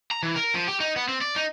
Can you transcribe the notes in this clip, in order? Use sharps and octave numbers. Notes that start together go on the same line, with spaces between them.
A#5
E3
A#4
F3
G4
D#4
B3
C4
D5
D#4